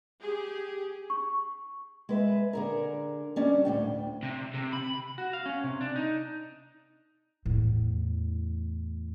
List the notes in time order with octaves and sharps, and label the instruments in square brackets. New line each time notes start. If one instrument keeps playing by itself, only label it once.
[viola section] G4 G#4
[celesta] C#6
[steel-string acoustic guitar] G#3 B4 E5
D3 G#4 A#4
G3 C#4 D4
D2 A2 C#3 G5
[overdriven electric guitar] C3
C3
B5
[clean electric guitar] F#4
F5
C#4
C3
D4
D#4
[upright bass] E2 A2